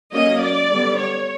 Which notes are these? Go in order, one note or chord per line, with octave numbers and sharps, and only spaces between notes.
F#3 A#3 C#4 D#5
D5
D3 G3 B3
C#5